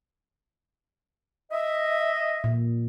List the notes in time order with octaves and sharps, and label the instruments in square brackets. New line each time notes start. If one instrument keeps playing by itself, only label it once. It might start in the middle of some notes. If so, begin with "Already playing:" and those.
[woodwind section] D#5 E5
[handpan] A#2